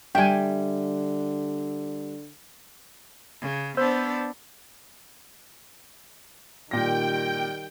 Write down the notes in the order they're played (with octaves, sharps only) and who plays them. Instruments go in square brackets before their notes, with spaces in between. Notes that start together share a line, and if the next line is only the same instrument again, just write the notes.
[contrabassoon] D3 [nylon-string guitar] G3 E5 [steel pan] G5 G#5
[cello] C#3
[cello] B3 D4 [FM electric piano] C5 E6 G6
[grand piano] A#2 A#6 [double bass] D#3 G3 [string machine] G5